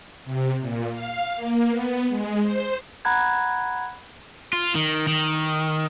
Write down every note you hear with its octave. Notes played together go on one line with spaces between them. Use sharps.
C3
A#2
F5
A#3
B3
G#3
C5
F#5 A#5 B5 F#6 G#6
F4
D#3
D#3